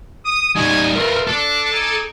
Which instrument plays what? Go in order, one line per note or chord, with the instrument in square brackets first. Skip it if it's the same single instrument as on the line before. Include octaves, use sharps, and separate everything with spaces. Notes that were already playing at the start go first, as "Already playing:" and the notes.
[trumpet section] D#6
[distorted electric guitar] G3 D#4 [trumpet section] C#5 G#5
[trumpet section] A3 F4 [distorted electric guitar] A#4 B4
[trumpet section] D4 [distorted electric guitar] A4
[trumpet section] D#4 G#5 D6